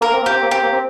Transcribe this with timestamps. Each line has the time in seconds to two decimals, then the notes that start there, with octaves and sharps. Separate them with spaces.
0.01 A#3 A#4
0.12 C4
0.22 A#3 G4
0.31 C4
0.42 A#3
0.51 C4 G4
0.63 A#3
0.72 C4